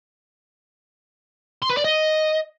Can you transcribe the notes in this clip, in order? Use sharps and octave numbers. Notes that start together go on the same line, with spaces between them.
C6
B4
D5
D#5